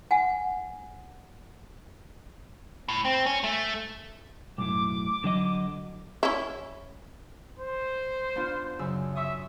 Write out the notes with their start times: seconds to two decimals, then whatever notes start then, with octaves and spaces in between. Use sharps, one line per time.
0.11 F#5 G#5
2.89 A2
3.05 C4
3.26 C#4
3.44 A3
4.58 B1 F#2 A2 D6
5.24 D3 F#3 D#5
6.23 C#4 E4
7.59 C5
8.36 B3 D4 F4
8.79 F#2 C#3 E6
9.15 E5 C6 C#6 D#6